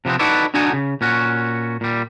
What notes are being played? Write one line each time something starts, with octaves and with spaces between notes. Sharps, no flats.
C3 F3 G3 B3 C4
D#4 E4 F#4 A4 B4 D5
D3 D4 D#4 F#4 G#5
C#3
A#2 C#4 F#4
A#2 G3